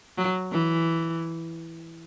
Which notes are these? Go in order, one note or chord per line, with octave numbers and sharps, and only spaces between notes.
F#3
E3